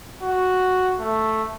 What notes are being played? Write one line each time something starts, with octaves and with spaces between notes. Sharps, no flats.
F#4
A3